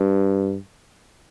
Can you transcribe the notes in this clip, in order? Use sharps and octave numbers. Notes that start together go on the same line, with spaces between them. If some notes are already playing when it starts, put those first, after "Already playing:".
Already playing: G2